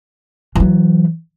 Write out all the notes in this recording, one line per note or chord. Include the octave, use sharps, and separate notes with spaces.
E3 F#3